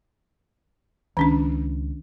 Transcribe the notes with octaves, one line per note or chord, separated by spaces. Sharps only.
C#2 D#3 C#4 D4